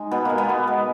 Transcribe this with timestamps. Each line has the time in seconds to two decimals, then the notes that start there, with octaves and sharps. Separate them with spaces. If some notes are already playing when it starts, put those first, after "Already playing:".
Already playing: G#3 D#4
0.11 B2 B3
0.25 G#3 A#3
0.38 B3
0.49 B2
0.67 G#3